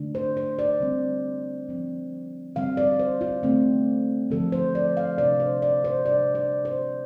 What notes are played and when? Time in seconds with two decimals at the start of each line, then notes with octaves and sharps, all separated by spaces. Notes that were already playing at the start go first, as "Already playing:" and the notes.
Already playing: D3 A3 D4
0.15 C5
0.37 C5
0.59 D5
0.80 D3 G3 C4
1.69 F3 C4
2.55 D3 G3 C4 F5
2.77 D5
2.99 C5
3.21 F4
3.43 D3 A3 C4
4.30 D3 F3 C4 A4
4.52 C5
4.75 D5
4.97 F5
5.18 C3 F3 D4 D5
5.40 C5
5.62 D5
5.84 C5
6.06 C3 G3 D4 D5
6.35 D5
6.65 C5